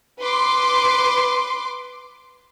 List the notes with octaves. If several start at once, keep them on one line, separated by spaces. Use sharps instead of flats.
B4 C6 D6